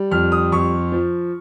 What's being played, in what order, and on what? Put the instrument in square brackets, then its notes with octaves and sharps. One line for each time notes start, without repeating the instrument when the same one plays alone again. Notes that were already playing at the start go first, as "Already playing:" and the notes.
Already playing: [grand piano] G3
F2 F6
D#6
F2 C#6
F3